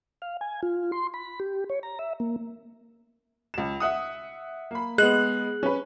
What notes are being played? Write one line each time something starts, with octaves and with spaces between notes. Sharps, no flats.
F5
G#5
F4
C6
B5
G4
C#5
A#5
E5
A#3
C#2 E7
E5 F#5 D#6
A#3 B5
G#3 B3 G#4 F#6 F#7
C#4 B4